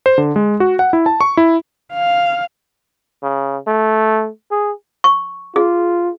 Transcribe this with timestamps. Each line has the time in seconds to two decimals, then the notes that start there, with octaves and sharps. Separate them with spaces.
0.06 C5
0.18 D3
0.36 G#3
0.60 F#4
0.79 F#5
0.93 E4
1.06 A5
1.21 C#6
1.37 E4
1.93 F5
3.23 C#3
3.67 A3
4.51 G#4
5.04 C#6
5.56 F4 G#4